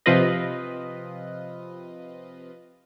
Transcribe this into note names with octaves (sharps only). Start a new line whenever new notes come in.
C3 F3 C4 F4 B4 D#5